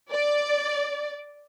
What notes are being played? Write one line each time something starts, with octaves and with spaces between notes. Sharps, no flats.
D5